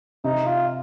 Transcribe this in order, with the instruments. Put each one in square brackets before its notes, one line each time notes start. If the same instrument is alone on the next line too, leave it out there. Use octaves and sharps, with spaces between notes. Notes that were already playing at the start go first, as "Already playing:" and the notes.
[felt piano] C3 [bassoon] D#4
[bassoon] F4